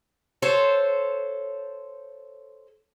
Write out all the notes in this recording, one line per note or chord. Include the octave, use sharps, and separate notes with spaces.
A4 C5 C#5